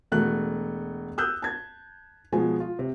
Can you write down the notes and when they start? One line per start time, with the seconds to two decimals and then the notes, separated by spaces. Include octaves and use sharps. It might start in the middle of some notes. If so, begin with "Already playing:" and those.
0.12 E1 A3 F#4 F#6
1.18 D#6 E6 F#6 G6
1.42 A5 G#6
2.32 B2 F3 G#3 G#5
2.60 F4
2.79 C3